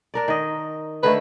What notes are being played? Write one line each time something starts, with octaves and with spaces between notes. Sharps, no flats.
D4 A#4 D5
D#3 D#5
D3 D#3 A3 B4